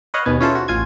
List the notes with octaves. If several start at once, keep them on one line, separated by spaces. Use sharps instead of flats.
B4 C#5 D#5 F5 F#5
D#2 B2 B3 G#5
C#4 E4 F4 G#4 A4 C5
F#4
A1 F4 G#5 G#6